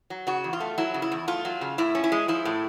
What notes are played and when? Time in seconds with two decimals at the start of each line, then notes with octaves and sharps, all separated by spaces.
0.10 F#3
0.27 C#3 F#4
0.44 E2
0.53 F4
0.60 A3
0.78 F#3 E4
0.94 C#3
1.02 E4
1.12 E2
1.28 A3 F4
1.45 F#3
1.61 C#3
1.78 A2 E4
1.95 C#4
2.04 E4
2.12 G#3
2.28 F3 E4
2.45 A2